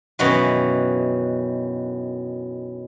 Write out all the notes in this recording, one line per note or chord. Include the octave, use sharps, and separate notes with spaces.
F#2 B2 D#3 E3 F#3